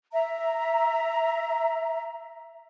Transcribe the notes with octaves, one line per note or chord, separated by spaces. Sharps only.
E5 A#5